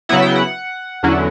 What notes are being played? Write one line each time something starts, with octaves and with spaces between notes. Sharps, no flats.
C#3 F#3 B3 E4 F#5
G5
F#5
E2 D3 F#3 C#4 E4